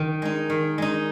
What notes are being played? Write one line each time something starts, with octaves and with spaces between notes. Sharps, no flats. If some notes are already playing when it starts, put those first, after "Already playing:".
Already playing: D#3
G#3 D#4
D#3
G#3 D#4